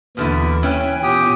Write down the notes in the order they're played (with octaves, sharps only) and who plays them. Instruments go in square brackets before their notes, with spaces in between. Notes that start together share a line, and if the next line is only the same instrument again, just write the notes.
[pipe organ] D#2 E3 F6 [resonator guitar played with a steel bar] B2 D3 E4
[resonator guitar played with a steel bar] E3 C#4 E4 [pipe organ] C#5 G5
[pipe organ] A#2 B3 [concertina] G4 G5 D#6